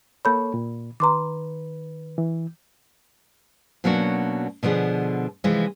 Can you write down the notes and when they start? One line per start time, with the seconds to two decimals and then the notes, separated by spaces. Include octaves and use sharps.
0.25 A#3 A4 C#5 B5 G6
0.54 A#2
1.00 D#3 B4 A#5 C6 D6
2.18 E3
3.84 B2 F#3 A#3 C#4 D4 F#4
4.63 B2 D3 F3 B3 G#4
5.44 C3 E3 F3 G#3